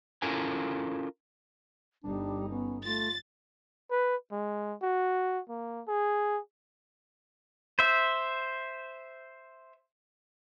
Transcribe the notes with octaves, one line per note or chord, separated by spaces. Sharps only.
C#4 E4 F4 A4 A#4 G#5
G1 G3 D4 D#4
B3 C#4
A3 F4 A6
B4
G#3
F#4
A#3
G#4
C5 E5